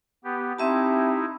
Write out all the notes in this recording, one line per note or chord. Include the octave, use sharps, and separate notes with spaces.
B3 G4
C4 D#4 E4 G4 E5 A5